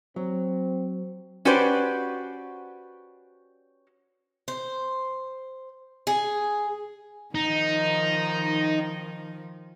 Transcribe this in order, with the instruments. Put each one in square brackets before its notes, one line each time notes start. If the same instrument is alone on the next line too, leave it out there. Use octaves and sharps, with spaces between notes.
[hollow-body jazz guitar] F#3 [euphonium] C4
[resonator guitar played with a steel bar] C#4 F#4 G4 B4 C5 D5
[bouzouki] C5
G#4
[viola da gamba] D#3 F3 [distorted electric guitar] D#4